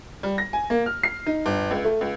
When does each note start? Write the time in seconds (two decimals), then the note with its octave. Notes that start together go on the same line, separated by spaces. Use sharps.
0.23 G3
0.38 A#6
0.53 G#5
0.70 A#3
0.86 F6
1.03 C7
1.26 D#4
1.46 G1
1.71 C#2
1.84 A3
2.01 C#2